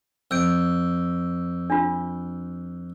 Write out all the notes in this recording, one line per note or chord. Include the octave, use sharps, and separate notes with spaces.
F2 E6 G6 D7
D4 F4